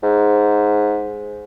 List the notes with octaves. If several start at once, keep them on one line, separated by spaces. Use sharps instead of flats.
G#2